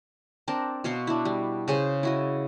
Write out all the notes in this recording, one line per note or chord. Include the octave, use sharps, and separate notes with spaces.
C4 D4 A#4 A5
B2 C#5 F5 C6
D4 E4
G3
C#3 G#4 C5
E4 F#4 D#5